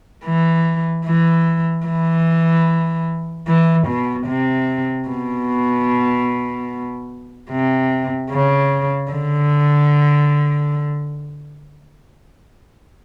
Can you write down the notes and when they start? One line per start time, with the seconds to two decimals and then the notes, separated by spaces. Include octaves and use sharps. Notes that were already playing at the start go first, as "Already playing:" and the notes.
0.25 E3
1.05 E3
1.86 E3
3.48 E3
3.88 B2
4.27 C3
5.09 B2
7.51 C3
8.31 C#3
9.11 D3